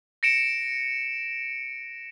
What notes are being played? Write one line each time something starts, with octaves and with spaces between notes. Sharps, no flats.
A#6 C#7 D7 E7